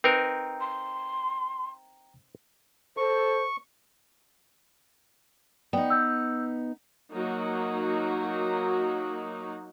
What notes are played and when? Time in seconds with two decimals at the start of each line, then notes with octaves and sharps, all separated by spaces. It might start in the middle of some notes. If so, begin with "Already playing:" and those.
0.04 C4 D#4 A#4 B4 G5 A#5
0.60 C6
2.97 A4 C5 C#6
5.73 B3 D#4 D5 G5
5.90 E6 G6
7.12 F#3 A#3 D#4 F#4